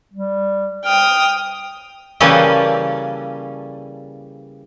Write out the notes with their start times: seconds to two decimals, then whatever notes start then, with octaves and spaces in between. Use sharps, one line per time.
0.14 G3
0.85 G5 D#6 F6
2.20 C#3 E3 G3 A#3 C#4 A4